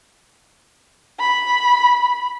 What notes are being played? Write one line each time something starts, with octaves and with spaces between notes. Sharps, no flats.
B5